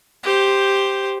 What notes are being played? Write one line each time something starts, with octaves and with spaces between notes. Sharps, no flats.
G4 C5